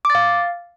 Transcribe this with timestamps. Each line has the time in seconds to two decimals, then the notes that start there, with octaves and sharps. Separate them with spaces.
0.05 D6
0.10 A6
0.15 F5